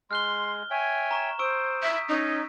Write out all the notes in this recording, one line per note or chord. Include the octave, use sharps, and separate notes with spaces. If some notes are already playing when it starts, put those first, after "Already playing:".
G#3 C6 F6 F#6 G7
C#5 E5 G5 G#5
A#5 C#6 E7
C5 C#6 D#6 E6 D7
E5 G6 B6
C#4 D#4